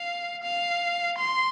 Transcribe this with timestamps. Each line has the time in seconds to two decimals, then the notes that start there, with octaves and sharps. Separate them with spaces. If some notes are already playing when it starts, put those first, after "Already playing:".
Already playing: F5
0.43 F5
1.18 C6